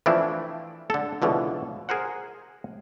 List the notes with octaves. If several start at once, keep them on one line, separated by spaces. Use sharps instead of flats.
E3 F3 A3 C4 D4 E4
D3 A4
C#2 B2 D3 E3 F3
G#4 A#4 C5 F#5